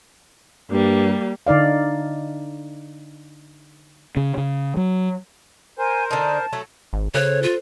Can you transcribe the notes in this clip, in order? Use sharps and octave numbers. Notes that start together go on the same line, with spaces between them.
G2 G3 A#3
D3 D#4 D5 F5
C#3
C#3
F#3
A#4 C5 G#5
D3 D#4 A5
F#3 A3 A4
G#1
C#3 A4 C5 C#5 F#6
F4